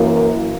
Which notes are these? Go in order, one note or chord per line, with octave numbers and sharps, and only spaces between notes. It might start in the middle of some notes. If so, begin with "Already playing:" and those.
Already playing: F#2 E3 A#3